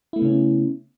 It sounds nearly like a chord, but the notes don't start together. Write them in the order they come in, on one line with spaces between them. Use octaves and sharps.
E4 A3 B3 C#3 C#4